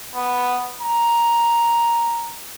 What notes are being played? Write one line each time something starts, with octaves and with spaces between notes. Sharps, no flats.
B3
A#5